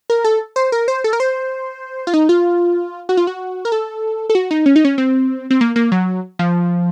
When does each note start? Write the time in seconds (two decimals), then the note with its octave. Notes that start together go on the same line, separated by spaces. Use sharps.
0.10 A#4
0.24 A4
0.56 C5
0.72 A#4
0.88 C5
1.04 A4
1.13 A#4
1.20 C5
2.07 F4
2.14 D#4
2.29 F4
3.09 F#4
3.17 F4
3.27 F#4
3.65 A#4
3.72 A4
4.29 A4
4.35 F#4
4.51 D#4
4.66 C#4
4.76 D#4
4.85 C#4
4.98 C4
5.50 C4
5.61 A#3
5.76 A#3
5.92 F#3
6.39 F3